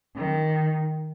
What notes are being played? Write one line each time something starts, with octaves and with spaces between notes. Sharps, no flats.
D#3